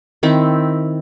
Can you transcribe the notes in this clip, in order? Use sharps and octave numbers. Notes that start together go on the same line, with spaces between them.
D#3 C4 E4